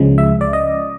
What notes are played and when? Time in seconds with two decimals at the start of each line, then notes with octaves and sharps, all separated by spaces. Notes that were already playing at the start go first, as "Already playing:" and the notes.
Already playing: C#2 C#3 F3 G#3
0.18 E5
0.41 D5
0.53 D#5